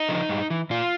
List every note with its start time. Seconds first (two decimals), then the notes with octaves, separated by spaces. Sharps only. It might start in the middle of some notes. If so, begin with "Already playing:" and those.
Already playing: D#4
0.09 D3 F3
0.29 G2
0.50 E3
0.70 A#2 F4